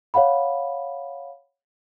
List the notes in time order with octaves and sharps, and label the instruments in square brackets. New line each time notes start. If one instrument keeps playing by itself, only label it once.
[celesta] C#5 F5 F#5 B5